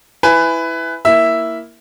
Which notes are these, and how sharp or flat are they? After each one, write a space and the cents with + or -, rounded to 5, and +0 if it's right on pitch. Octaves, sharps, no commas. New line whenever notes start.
E4 +0 B4 +15 G#5 +0
A#3 +0 E4 +0 E5 +0